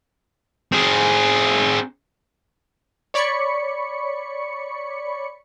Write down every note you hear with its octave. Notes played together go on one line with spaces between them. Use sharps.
C4 G#4
C#5 D5 B5 C#6 C#7